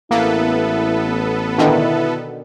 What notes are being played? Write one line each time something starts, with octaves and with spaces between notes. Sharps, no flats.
A1 A#3 B3 E4 A4 B4
B2 D3 D#3 E4